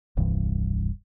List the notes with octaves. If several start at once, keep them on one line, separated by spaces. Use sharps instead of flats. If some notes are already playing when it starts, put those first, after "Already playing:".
D#1 C2 G2 E3